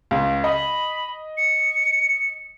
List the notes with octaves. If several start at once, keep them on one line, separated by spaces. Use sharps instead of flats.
C#2
D#5 B5
C#7